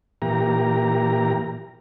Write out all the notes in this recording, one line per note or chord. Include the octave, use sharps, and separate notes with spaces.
A#2 E3 G4 A#5